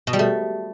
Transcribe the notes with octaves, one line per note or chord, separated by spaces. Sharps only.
B2
G3
A3